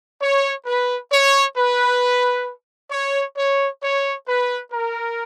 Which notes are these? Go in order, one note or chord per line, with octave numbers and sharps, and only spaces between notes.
C#5
B4
C#5
B4
C#5
C#5
C#5
B4
A#4